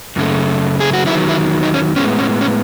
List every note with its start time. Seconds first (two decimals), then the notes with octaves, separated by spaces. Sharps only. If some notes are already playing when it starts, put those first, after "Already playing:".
0.16 F#2 C#3 A3
0.80 G#4
0.93 F#4
1.06 E2 D#3 F#3 E4
1.29 E4
1.63 D#4
1.74 C#4
1.96 A2 G#3 B3 C#4
2.19 C#4
2.41 C#4